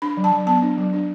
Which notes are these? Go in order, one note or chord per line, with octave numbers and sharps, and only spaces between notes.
D4 B5
F#3
A5
F#3
B3 A5
D4
F#3
D4